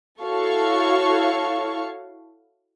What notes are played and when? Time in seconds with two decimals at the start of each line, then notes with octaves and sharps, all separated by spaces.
0.21 E4 F#4 A4 C#5 F5 C#6